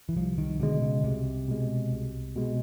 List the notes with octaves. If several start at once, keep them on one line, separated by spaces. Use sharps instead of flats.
E3
C2 F3
D#3
B2 D3 G#3
C#3
C2 C3
B2 G#3
C2
B2 G#3